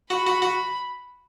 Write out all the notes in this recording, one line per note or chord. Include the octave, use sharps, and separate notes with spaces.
F#4 B5
F#4
F#4